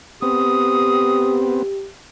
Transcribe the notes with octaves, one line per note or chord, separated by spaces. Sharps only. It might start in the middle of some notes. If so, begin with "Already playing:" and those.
B3 C4 G4 D#6